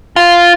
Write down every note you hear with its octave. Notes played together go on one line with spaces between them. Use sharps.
F4